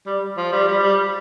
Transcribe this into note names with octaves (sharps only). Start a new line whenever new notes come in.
G3
F3
G3
G3
G3